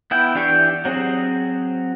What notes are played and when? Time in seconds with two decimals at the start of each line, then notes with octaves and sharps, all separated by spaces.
0.11 B3 E4 G5
0.35 E3 D4 G4 G5 C#6
0.85 F#3 C4 F#4 G#4